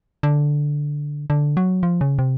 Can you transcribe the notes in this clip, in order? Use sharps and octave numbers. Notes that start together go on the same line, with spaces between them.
D3
D3
F#3
F3
C#3
C3